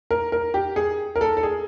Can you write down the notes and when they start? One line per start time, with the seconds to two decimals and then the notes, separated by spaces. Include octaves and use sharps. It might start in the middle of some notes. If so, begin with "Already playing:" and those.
0.11 A#4
0.32 A#4
0.54 G4
0.76 G#4
1.16 A#4
1.21 A4
1.37 A4
1.43 G#4